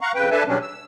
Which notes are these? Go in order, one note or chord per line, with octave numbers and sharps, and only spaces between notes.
F5 F#5 A#5 C#6
F2 C#3 B4 G5
D4 A4 B4 E5 G#5 A5
E2 B2 F#3 G3 C#4 D4
E6